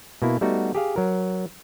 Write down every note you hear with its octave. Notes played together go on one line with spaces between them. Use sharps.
B2 A#3 E4
G3 A3 B3 D#4 F#4
G4 G#4 F5
F#3 A#4